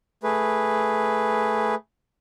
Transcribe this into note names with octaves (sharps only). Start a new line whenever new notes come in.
A3 G#4 B4